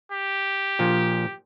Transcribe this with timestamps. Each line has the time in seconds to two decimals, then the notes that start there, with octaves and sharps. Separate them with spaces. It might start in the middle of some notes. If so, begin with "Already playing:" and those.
0.12 G4
0.79 A#2 F3